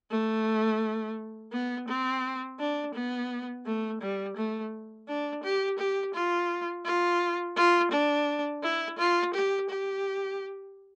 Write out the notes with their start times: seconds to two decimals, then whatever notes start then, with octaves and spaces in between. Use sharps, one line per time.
0.11 A3
1.53 B3
1.88 C4
2.59 D4
2.94 B3
3.66 A3
4.01 G3
4.36 A3
5.08 D4
5.43 G4
5.79 G4
6.14 F4
6.85 F4
7.56 F4
7.91 D4
8.63 E4
8.98 F4
9.34 G4
9.69 G4